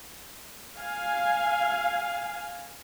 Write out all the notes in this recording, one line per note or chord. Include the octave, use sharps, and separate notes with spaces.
F5 G#5